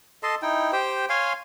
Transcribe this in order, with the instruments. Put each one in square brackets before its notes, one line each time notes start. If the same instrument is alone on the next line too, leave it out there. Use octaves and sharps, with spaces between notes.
[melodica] A4 D#5 A5 C6
D#4 E4 G5
G4 C5 G5
C#5 F5 G#5 C6